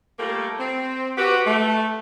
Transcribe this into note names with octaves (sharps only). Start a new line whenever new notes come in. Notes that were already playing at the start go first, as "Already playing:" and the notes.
G3 A3 A#3 F4 A4 A#4
C4
F#4 G4 B4
A3